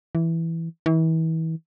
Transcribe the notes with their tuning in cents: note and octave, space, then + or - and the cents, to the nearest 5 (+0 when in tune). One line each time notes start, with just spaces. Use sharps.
E3 +0
E3 -35